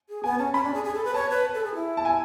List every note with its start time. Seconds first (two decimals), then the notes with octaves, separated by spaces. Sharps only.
0.09 G#4
0.24 B3 G#5
0.38 C#4 A5
0.54 C#4 B5
0.64 D4
0.74 G#4
0.84 G#4
0.94 A4
1.04 B4
1.14 C#5 A5
1.30 B4
1.54 A4
1.64 G#4
1.75 E4
1.97 A5
2.05 G#5